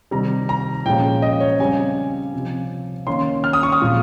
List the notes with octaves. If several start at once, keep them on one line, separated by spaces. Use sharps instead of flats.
C3 D#3 G3 C4 A#5
A#5
A#2 F3 G#3 C#4 G5
D#5
C#5
C#3 G3 C4 G#5
C3 F3 C4
D#3 A#3 C#4 C6
F6
D#6
C#6
D#6
A#2 F3 G#3 C4